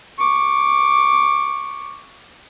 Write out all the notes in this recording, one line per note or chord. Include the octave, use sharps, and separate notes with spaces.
C#6 D6